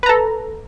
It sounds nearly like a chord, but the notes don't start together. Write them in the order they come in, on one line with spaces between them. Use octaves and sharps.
B4 A#5 A4